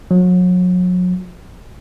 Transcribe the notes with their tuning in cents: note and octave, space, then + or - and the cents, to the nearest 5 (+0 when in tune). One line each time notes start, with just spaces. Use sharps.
F#3 -35